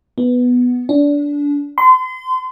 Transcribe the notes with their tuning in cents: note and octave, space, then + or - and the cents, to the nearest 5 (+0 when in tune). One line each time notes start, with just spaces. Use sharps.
B3 +0
D4 -25
C6 -35